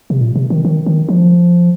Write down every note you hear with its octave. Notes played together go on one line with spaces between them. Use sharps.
C3
A#2
C3
D#3
D#3
D#3
F3